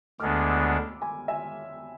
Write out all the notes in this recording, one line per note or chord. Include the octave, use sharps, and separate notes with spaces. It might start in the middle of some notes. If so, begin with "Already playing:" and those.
D2 D3 G#3 B3 D4 D6 F6
E6
B5 D6
G#5 B5
E5 G#5